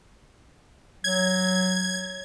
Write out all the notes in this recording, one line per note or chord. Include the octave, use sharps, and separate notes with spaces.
F#3 G#6